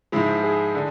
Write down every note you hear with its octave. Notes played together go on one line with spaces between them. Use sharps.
G#2 F3 G#3 E4
G#4
D3